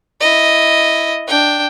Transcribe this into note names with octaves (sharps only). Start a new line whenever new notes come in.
E4 D#5
D4 G5